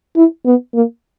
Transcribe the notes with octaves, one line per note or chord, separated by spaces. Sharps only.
E4
B3
A#3